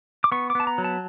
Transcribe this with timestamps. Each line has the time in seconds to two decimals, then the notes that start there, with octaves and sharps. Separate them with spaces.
0.24 D6
0.32 B3 C#6
0.50 D6
0.55 B3 A5
0.67 A#5
0.78 F#3
0.84 A5